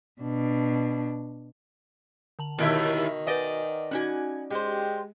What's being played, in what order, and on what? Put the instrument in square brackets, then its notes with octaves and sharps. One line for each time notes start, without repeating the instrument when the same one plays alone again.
[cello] B2 D4
[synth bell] D3 A5 F#7
[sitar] D#2 E4 [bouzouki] B2 E5 [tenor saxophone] D#3
[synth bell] B4 F#5 G#5 [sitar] D5 D#5
[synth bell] C#4 D#4 F#4 [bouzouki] F#5 G#5
[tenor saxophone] G#3 [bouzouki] G4 C5